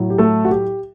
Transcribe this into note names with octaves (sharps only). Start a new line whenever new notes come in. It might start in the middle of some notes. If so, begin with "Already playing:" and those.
Already playing: A2 F#3
G4
A3 A4
F#4
G4